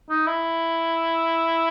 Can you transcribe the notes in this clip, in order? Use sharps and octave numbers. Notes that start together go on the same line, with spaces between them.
D#4
E4